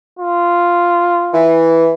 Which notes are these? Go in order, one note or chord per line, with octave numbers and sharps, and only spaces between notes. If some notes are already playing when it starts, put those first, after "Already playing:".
F4
E3